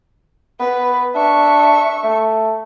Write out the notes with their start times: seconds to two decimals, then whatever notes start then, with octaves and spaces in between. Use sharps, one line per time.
0.60 B3 B4
1.15 D4 E5 C#6
2.04 A3